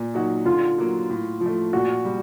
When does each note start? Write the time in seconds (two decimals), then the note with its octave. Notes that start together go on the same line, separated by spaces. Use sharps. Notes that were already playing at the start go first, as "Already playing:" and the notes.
Already playing: A#2
0.14 F#3 A#3 D#4 F#4
0.45 D3 F4
0.78 F#3 A#3
1.10 A2
1.41 F3
1.46 A3
1.73 A#2 F#4
2.05 G3